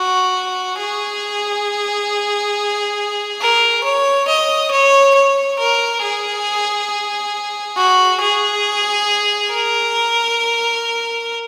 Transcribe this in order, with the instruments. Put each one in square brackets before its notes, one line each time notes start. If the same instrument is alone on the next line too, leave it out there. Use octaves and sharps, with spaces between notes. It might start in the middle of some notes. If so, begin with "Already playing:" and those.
Already playing: [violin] F#4
G#4
A#4
C#5
D#5
C#5
C#5
A#4
G#4
F#4
G#4
A#4